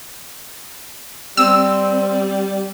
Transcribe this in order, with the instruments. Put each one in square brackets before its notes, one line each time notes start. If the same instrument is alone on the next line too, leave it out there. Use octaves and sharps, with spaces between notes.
[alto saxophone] G3 [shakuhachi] C4 [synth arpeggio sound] E6